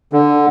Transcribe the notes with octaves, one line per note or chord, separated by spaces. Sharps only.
D3